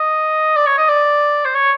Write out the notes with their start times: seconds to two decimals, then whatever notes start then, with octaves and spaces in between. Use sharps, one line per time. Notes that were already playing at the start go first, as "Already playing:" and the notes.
Already playing: D#5
0.56 D5
0.67 C#5
0.78 D#5
0.89 D5
1.45 C5
1.55 C#5